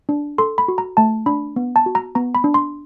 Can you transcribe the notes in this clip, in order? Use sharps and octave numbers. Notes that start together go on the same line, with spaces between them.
D4
A4 C6
B5
F#4
A#5
A3 A5
D4 B5
B3
A5
F#4
A#5
B3 A#5
B5
D4
C6